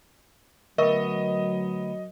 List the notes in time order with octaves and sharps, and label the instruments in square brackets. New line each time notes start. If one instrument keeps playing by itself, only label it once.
[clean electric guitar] D2 B3 [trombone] F#3 [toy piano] A#4 E5 C#6 [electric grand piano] D#5